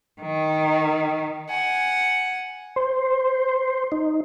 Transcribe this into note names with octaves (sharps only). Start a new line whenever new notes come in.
D#3
F#5 G#5
C5
D#4